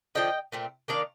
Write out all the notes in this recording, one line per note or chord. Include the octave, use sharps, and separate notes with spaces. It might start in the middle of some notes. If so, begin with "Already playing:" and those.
D3 F3 A3 D4 D#5 G5
A#2 A3 C4
D#3 A#3 D4 D5 F5